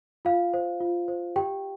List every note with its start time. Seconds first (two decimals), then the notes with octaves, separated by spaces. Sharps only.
0.25 F4 F5
0.54 C5
0.80 F4
1.08 C5
1.36 G4 G5